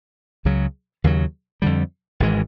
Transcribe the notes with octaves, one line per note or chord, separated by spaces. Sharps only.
C#2 C#3 F#3
D#2 C#3 F#3
F2 D3 G3
G#1 G#2 E3 G#3